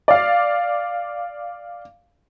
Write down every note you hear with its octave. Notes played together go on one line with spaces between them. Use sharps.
D5 F5